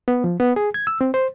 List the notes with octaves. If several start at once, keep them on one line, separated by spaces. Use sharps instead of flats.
B3
F3
B3
G#4
G#6
E6
C4
C5